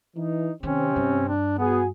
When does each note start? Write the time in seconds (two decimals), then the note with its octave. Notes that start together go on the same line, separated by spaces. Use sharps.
0.17 E3 D#4
0.63 C3 D#3 C4 C#4
0.96 G2
1.28 D4
1.58 B3 F#4 G#4